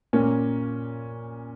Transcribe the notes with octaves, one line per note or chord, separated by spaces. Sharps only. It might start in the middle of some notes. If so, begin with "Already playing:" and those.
A#2 A#3 C#4